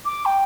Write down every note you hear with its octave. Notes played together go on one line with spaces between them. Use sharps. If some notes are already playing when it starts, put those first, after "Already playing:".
D6
G5